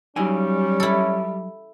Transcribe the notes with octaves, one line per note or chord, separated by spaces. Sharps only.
F#3 G3 C#4 D#4 G#5
E4 A4